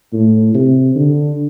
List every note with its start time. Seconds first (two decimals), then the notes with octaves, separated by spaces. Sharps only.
0.13 A2
0.55 C3
0.95 D3